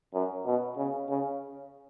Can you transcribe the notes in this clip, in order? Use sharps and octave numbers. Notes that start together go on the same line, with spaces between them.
F#2
B2
C#3
C#3